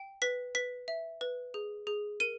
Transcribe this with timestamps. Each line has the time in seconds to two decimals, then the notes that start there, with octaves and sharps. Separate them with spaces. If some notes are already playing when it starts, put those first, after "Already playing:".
Already playing: G5
0.22 B4 B6
0.55 B4 B6
0.88 E5
1.21 B4
1.54 G#4
1.87 G#4
2.20 A#4 D#7